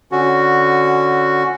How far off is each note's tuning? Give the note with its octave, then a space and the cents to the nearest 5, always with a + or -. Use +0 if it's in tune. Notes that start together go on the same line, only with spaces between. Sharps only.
D3 +0 C#4 +0 F#4 +0